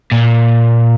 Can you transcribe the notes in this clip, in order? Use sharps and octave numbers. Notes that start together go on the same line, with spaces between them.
A#2